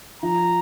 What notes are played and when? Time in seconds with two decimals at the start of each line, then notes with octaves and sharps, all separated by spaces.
0.22 F3 A#5